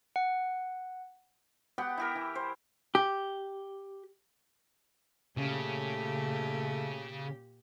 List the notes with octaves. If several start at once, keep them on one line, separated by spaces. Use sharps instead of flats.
F#5
B3 G4 F#5 G5
E4 G4 A#4
E3
C5
G4
A#2 C#3 A3 G4